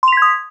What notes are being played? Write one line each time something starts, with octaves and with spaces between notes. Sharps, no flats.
C6 D#6 G#6 B6 F7